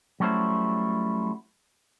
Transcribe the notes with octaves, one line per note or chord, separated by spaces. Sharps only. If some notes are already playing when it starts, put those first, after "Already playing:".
F#3 G3 A3 C#4 E4 C5